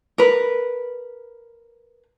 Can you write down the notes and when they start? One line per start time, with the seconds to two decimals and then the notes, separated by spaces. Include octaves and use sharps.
0.18 A#4 B4